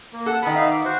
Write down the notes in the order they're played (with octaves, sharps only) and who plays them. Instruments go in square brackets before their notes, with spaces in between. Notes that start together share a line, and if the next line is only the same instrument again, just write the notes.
[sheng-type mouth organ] A#3
[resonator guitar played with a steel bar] A4 [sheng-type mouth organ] F#5
[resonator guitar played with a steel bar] D#3 B3 [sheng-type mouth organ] B5
[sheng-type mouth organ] D#4 E5 F5
D6
F#4 C5